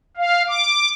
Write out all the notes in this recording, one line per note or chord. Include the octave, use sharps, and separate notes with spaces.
F5
D6